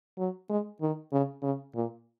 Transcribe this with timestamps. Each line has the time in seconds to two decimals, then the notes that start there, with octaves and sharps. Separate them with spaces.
0.18 F#3
0.50 G#3
0.81 D#3
1.12 C#3
1.43 C#3
1.75 A#2